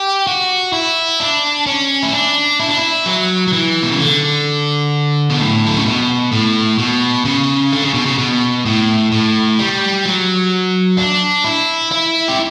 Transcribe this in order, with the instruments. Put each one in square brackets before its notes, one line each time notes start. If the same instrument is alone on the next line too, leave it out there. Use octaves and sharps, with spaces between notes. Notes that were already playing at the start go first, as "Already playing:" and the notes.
Already playing: [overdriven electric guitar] G4
F#4
E4
D4
C#4
E4
D4
E4
D4
E4
F#3
F#3
E3
B2
C#3
D3
B2
A2
D3
C#3
B2
A2
B2
C#3
D3
C#3
B2
C#3
B2
A2
A2
G3
F#3
D4
E4
E4
G4